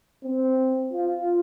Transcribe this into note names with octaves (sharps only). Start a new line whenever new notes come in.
C4
F4